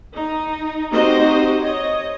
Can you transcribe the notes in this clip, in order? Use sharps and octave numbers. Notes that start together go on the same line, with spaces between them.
D#4
C4 D#4 F#4 G4 C5 D#5
C#5 D#5